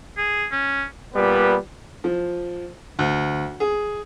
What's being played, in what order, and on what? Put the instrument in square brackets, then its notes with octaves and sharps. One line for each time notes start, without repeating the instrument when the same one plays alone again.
[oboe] G#4
C#4
[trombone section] A#2 G3 B3 B4
[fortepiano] F3
D2
G#4